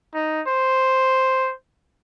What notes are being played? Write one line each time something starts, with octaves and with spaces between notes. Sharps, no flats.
D#4
C5